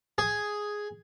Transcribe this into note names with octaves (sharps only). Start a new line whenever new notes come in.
G#4